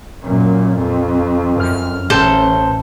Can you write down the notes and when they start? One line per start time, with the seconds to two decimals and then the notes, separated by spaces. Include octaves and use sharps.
0.23 F#2 A#2
0.76 F2
1.57 F#2 F6
2.10 A1 A2 A4 C5